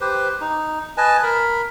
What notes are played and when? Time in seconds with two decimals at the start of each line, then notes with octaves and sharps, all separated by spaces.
0.01 G4 B4 C5
0.41 D#4
0.97 B4 D#5 G#5 A5
1.23 A#4 B5